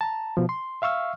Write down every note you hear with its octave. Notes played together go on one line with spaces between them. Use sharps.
A5 A#5
B2 F3
C6
E5 F5 C#6 E6 F6